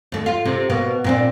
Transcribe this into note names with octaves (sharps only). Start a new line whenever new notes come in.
D#2 A3
F4
C3
B2 A#3 B3
A#2 C4 D4